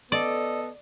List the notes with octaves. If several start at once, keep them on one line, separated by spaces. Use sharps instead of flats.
B3 A4 D5 D#5